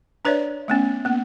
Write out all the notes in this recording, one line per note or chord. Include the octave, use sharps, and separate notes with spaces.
D4 B4 C#5 D5 E5
A3 B3 C#4
A#3 B3